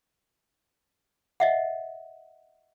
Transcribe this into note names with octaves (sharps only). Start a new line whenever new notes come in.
D#5 E5 F#5